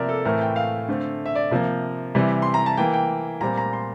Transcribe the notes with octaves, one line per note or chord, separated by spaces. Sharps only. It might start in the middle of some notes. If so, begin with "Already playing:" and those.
Already playing: C3 F3 A#3 A#4 D5 E5
A4
A2 E3 A3 C4 A#4
G5
F5
D3 A3 C4
E5
D5
C3 F3 A#3
C3 E3 G3
C6
A#5
A5
E3 A#3 G5
G5
A#2 G3 C4 A#5
A#5
C6